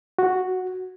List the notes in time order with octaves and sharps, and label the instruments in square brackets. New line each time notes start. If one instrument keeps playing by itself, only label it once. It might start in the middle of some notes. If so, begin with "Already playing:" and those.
[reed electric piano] F#4